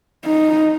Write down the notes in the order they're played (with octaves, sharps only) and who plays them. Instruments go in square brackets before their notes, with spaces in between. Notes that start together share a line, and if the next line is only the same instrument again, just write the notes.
[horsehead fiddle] D#4